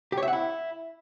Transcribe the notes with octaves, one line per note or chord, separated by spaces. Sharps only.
G4
C#5
E5
F#5
E4